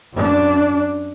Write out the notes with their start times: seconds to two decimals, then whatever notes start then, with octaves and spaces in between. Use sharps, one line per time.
0.14 F#2 D4